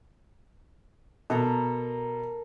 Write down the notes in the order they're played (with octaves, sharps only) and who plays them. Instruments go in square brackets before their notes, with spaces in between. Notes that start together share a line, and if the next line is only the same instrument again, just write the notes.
[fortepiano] B2 [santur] A4 A#4 A#5